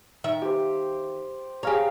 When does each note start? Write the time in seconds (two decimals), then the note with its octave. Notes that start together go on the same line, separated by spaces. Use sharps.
0.24 D#3 E5
0.42 G4 C5
1.63 G4 G#4 C#5 F5 A#5